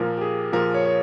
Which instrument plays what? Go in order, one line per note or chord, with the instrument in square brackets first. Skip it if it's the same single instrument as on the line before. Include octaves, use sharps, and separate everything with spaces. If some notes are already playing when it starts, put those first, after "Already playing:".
Already playing: [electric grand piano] A#2 F3 A#4
G4
G#4
A#2 F3 A#4
C#5
C#5